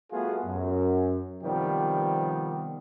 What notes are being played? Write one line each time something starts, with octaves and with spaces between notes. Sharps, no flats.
G3 A3 B3 F4 F#4 G#4
F#2
C3 D#3 F3 G3 B3 G4